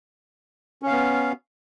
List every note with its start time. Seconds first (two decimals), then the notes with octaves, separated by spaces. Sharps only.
0.82 C#4
0.87 F5
0.91 B3